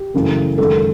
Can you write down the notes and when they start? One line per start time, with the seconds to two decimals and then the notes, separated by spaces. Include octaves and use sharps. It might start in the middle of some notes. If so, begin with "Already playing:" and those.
Already playing: G4
0.14 F#2 C#3 E3 A3
0.58 F#2 D#3 G#3 A4